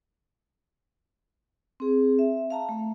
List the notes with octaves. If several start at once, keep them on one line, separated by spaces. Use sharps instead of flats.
C4 G#4
E5
F5 A5 A#5
A3